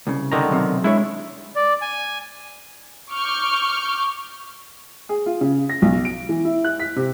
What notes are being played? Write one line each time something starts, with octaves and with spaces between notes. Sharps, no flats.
C2 C#3
D3 D#3 A#5
B1 C3
G#3 D4 E4 C#5
D5
G#5
C#6 D6 F6 G6
G#4
F4
C#3
A#6
B1
D7
E3
E4
F#6
B6
C3